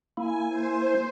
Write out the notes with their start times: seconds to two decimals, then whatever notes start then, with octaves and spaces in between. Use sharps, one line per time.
0.17 A#3 E4 G#5
0.49 C5